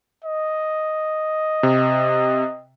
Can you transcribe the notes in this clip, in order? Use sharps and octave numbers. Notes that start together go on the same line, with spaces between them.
D#5
C3